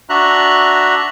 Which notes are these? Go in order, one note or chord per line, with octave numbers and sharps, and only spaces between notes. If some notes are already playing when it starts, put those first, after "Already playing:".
D4 F#4 E5 A#5 F#6